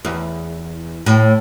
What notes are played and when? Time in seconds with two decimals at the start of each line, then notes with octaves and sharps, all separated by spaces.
0.05 E2
1.06 A2